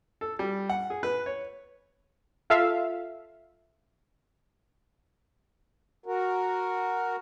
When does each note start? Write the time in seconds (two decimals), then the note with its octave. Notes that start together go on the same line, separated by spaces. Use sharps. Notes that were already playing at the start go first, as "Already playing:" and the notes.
0.21 A4
0.39 G3
0.70 F#5
0.90 G#4
1.03 B4
1.26 C#5
2.50 F4 A4 E5 F5
6.06 F#4 A#4